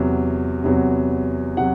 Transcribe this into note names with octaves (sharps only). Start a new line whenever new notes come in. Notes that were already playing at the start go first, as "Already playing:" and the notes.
Already playing: E2 C3 F#3
E2 C3 F#3
C3 F#3 F#5